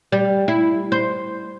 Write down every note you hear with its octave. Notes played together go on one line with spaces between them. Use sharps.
G3
E4
C5